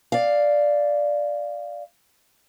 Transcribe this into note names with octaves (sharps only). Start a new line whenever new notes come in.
D5 F5